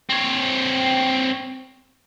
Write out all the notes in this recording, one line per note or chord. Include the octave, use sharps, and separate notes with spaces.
C4 C#5